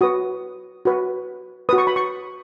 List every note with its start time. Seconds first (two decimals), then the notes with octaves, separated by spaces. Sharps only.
0.01 F#4 B4 D#6
0.85 F#4 B4
1.69 F#4 B4 D#6
1.78 C#6
1.87 B5
1.96 C#6